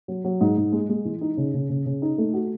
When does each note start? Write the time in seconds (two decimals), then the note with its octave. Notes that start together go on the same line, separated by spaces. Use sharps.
0.08 F#3
0.25 F#3
0.41 G#2
0.57 G#2
0.72 G#3
0.89 G#3
1.05 E3
1.21 D#4
1.37 C#3
1.54 C#3
1.70 C#3
1.86 C#3
2.02 D#4
2.18 A3
2.34 F#4